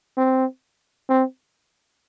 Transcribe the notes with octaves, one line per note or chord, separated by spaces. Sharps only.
C4
C4